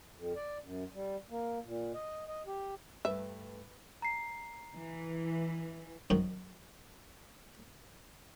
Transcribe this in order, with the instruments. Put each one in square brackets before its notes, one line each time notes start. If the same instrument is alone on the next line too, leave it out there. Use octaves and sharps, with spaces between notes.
[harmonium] F2
D5
F#2
G3
A#3
A#2
D#5
D#5
G4
[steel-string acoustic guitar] G2 A3 [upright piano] B4 [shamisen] E5
[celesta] A#5 C7
[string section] E3
[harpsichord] F#2 D#3 F#3 D#4 F#4 C5